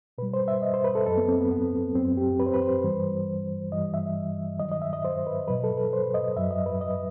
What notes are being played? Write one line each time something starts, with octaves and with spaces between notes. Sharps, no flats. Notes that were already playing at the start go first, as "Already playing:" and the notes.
B2 G3 B4
C5
E5
D#5
C5
B4
A4
F#2 F#3 A4
B3
C4
B3
B3
F#2 F#3 C4
G4
B4
C5
B4
C5
G2 E3 G3
G2 E3 G3 D#5
E5
G2 D#3 F#3 D#5
D#5
E5
D#5
C5
B4
B2 F#3 B4
A4
B4
C5
D#5
F#2 F#3 E5
D#5
B4
D#5